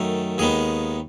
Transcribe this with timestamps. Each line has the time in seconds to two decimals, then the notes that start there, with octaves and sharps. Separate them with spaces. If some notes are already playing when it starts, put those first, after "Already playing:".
Already playing: F#2 D#3 A3
0.38 D#2 D#3 G#3 B3 G#4